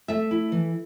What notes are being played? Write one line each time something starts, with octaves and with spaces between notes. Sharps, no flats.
A3 E5
E4
E3